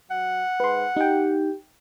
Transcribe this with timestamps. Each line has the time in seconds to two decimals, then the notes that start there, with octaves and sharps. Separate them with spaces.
0.11 F#3 F#5
0.60 G#2 B4 C6
0.97 D#4 G4 G5